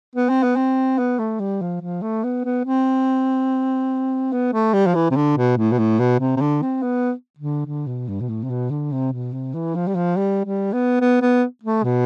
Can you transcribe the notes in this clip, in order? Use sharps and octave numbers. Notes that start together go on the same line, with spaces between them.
B3
C4
B3
C4
B3
A3
G3
F3
F3
A3
B3
B3
C4
B3
A3
G3
F3
E3
C3
D3
B2
A2
B2
A2
B2
C3
C3
D3
C4
B3
D3
D3
B2
G2
B2
A2
C3
B2
D3
C3
B2
C3
E3
F3
G3
F3
G3
G3
B3
B3
B3
A3
B2